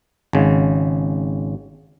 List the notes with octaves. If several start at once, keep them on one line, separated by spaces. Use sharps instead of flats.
G#1 C#3